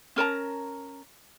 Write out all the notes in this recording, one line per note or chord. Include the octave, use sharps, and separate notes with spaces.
C#4 A#4 A5 A#5